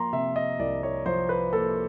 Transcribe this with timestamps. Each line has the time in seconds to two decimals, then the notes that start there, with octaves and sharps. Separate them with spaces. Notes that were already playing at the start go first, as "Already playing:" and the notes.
Already playing: F3 A#3 A#5 C6
0.13 C3 E5
0.36 D#5
0.59 C2 D5
0.83 C#5
1.06 F3 C5
1.29 B4
1.52 A#3 A4